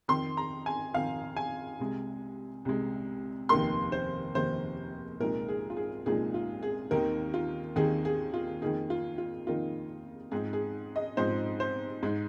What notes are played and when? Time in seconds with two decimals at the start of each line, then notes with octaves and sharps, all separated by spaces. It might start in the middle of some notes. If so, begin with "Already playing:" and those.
0.08 F2 D#3 C4 C6
0.37 A#5
0.66 G#5
0.94 F2 D#3 C4 F5
1.36 G#5
1.80 C2 C3 G#3
2.65 C2 C3 G#3
3.49 F1 D#2 D#3 A#3 C6
3.92 C5
4.35 F1 D#2 D#3 A#3 C5
5.20 C2 A#2 F3 G#3 D#4 A#4
5.48 G#4
5.70 F4
5.77 G#4
6.06 C2 A#2 F3 G#3 D#4 G#4
6.34 F4
6.63 G#4
6.91 D#2 D#3 C4 D#4 A#4
7.34 F4
7.76 D#2 D#3 C4 D#4 G#4
8.05 G#4
8.34 F4
8.62 F2 D#3 A#3 D#4 G#4
8.90 F4
9.18 F4
9.47 F2 D#3 A#3 D#4 F4
10.32 G#2 F3 C4 D#4 G#4
10.53 G#4
10.96 D#5
11.17 G#2 F3 C4 D#4 C5
11.60 C5
12.03 G#2 G#3 D#4